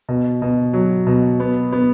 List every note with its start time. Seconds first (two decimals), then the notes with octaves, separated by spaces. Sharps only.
0.09 B2
0.42 B2
0.73 F#3
1.07 B2
1.40 B3
1.73 B3